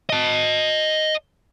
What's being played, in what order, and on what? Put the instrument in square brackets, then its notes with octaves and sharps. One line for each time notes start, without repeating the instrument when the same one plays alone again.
[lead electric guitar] D#5 A5